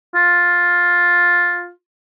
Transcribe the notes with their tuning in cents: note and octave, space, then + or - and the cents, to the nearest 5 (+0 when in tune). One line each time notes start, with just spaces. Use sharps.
F4 +10